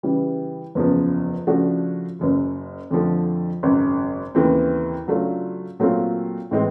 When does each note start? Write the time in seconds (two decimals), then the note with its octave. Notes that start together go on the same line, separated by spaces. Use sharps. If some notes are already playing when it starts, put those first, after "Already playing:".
0.03 C#3 E3 G3
0.75 F#1 E2 C#3 F3
1.47 C#3 F3 A3 D4 F#4
2.19 F#1 F#2 C#3
2.91 F2 D3 F3 A3
3.63 G#1 F#2 C#3
4.35 D#2 C#3 E3 A3 C4
5.07 C#3 F#3 A3 D4 F4
5.79 A#2 F#3 A3 C4 F4
6.51 A2 E3 G#3 C4